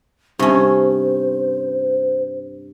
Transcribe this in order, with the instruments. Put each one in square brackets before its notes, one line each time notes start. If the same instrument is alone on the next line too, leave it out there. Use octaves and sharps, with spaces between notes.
[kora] G2 [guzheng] C3 C#4 [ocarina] C5